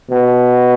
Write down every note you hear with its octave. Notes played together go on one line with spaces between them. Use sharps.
B2